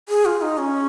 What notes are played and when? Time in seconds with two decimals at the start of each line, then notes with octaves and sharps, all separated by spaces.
0.09 G#4
0.25 F4
0.42 D#4
0.58 C#4